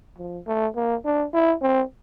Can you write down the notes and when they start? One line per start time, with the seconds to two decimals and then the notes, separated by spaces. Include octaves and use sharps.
0.19 F3
0.47 A3
0.75 A#3
1.05 D4
1.34 E4
1.62 C4